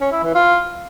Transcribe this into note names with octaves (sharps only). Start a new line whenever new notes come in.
C#4
E4
E3
F4